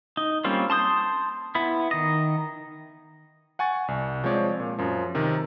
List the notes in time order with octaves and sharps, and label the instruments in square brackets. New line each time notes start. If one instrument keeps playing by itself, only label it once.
[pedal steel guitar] D#4
G3 A#3 C4 C#4 F4
A5 C6 D#6 G6
B3 E4
D#3 D#5
[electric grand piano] F#5 G#5 C#6 A6
C2
F3 G#3 C4 C#5 D5
A#2
F#2 F3
C3 D#3